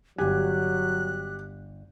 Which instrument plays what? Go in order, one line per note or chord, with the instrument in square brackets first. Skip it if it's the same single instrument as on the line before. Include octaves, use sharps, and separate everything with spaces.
[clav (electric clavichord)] G1 G#5 [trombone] F#3 [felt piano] G4 [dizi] F#6